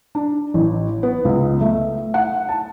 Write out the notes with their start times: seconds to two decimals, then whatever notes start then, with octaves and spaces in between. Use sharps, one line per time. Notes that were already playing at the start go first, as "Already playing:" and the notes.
0.15 D4
0.54 A1
1.03 B3
1.25 C#2
1.61 A3
2.14 F#5
2.49 A5